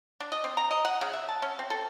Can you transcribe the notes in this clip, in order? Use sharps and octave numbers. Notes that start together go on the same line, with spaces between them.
D4
D#5
C4
A#5
D#5
F#5
C#3
E5
A5
C#4
C4
A4